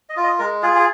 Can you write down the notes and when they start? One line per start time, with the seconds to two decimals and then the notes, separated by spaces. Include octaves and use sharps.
0.09 D#5
0.16 F4
0.24 D#5
0.39 G#3 A#4
0.63 F4 G#4
0.75 G#4